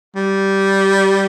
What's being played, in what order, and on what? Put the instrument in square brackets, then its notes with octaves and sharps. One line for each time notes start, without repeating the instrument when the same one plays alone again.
[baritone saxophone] G3